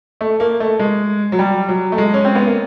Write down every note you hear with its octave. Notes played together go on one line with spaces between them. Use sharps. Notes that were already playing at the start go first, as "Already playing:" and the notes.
A3
A#3
A3
G#3
F#3
G3
F#3
A3
G#3
C#4
C4
B3
A#3